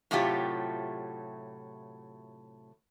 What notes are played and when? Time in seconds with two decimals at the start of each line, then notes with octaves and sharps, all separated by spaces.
0.11 A2 C3 F#3 A3 F4 G4